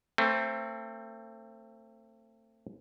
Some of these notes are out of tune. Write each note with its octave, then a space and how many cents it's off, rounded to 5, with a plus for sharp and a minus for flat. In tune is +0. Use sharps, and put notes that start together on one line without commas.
A3 +35 C4 +20 B4 +15